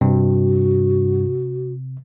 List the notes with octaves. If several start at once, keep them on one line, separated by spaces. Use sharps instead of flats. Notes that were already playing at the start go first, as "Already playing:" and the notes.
G2 C3 F#4